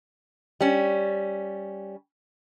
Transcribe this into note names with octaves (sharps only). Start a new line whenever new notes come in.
G3 C#4